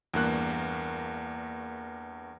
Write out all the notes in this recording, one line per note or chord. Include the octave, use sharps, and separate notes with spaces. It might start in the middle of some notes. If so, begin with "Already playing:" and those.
E2 G2 A#3 F#6